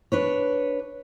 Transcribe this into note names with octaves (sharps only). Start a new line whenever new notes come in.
D4 B4 C#5